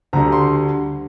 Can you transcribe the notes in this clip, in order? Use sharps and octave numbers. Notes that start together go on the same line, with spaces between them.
D2 D3 G3 A#5
C6